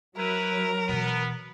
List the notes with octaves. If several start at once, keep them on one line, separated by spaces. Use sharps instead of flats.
F#3 E4 A#4 B4
B2 E3 B3